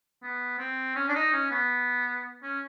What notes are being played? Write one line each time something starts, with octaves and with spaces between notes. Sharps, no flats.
B3
C4
C#4
D4
D#4
C#4
B3
C#4